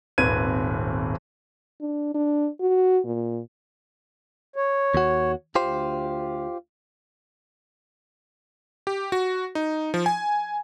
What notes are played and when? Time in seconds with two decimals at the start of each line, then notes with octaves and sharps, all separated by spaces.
0.18 D#1 G#1 C4 B4 G#6 D#7
1.81 D4
2.14 D4
2.60 F#4
3.05 A#2
4.56 C#5
4.94 D#2 F#4
5.55 D2 F4 G4 C5
8.87 G4
9.12 F#4
9.55 D#4
9.94 F3
10.06 G#5